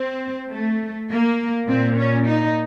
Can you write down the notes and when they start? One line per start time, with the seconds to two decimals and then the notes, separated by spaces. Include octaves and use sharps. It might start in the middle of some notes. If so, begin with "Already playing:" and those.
Already playing: C4
0.51 A3
1.09 A#3
1.68 A#2 C4
1.96 C#4
2.26 D#4